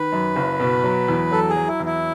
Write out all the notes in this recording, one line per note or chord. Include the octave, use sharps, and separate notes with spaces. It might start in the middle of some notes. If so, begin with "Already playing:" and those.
Already playing: D#3 B4
F#2
F#1
B2
F#3
E2
F#3 A4
G#4
F#3
E4
E2
E4